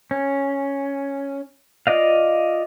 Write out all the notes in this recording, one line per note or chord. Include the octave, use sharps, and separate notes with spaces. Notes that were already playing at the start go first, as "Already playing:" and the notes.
C#4
F4 D5 D#5 F5